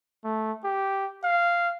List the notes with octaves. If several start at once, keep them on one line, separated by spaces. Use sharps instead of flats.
A3
G4
F5